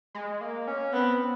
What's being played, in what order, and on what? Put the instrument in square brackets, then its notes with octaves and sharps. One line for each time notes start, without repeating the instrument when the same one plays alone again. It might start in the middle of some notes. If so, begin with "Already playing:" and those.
[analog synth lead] G#3
A#3
C#4
[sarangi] B3 [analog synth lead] C4